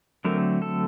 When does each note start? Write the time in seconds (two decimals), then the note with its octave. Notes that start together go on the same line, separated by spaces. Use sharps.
0.25 D3 F#3 A3 C4 A#4
0.62 A4